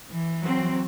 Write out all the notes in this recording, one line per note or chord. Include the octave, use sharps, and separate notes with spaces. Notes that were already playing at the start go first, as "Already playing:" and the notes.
E3
F#3 C4